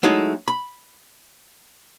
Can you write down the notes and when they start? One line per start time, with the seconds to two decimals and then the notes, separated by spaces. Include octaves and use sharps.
0.03 F#3 G#3 A3 D#4 E4
0.48 B5